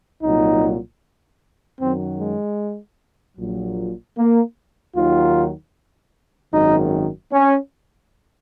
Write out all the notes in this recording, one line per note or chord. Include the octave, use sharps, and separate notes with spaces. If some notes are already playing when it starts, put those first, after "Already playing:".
C2 A#2 F#3 D#4
F#2 D#3 F#3 C4
G#3
A#1 A#2 F#3
A#3
D#2 D#3 F#3 F4
G#1 F#2 D#3 D#4
C#4